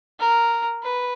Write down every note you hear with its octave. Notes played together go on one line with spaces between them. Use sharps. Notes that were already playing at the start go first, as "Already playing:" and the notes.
A#4
B4